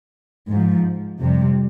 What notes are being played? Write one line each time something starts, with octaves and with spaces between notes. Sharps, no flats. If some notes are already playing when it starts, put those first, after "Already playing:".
G#2
F3
F2 C3 G3